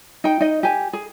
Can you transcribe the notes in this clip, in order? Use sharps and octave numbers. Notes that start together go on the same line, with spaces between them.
D#4 G5
D#4 D#5
G4 G#5
G#4